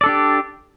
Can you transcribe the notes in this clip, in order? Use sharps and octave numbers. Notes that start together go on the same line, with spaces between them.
D4 G4 A4 D5